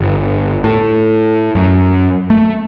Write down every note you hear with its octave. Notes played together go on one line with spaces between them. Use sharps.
G1
A2
F#2
A3